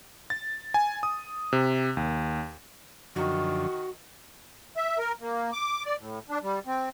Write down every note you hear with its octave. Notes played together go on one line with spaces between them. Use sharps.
A6
G#5
D#6
C3
D#2
F#2 D3 D#3 F3 F#4
E5
A#4
A#3
D6
D5
A2
D4
G3
C4